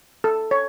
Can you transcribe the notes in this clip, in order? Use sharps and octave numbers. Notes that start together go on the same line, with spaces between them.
A4
C#5